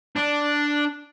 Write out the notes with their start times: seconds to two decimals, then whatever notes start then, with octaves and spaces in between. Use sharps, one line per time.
0.16 D4